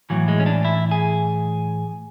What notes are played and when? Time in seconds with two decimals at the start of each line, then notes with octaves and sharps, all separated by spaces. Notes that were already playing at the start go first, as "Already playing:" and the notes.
0.10 A2 E3 F#3
0.28 G#3
0.40 C#4
0.46 D4
0.65 E4
0.91 G#4